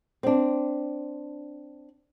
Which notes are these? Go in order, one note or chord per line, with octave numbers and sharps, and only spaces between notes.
C4 D4